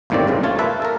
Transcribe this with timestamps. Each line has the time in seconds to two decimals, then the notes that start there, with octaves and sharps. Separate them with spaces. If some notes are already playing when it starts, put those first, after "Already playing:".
0.10 G1 D#2 A2 D#3 C4 D5
0.27 C2 G2 C#3
0.43 A#1 A3 F4 C#5 A5
0.59 A#3 B4 E5 A5
0.82 A4 A#4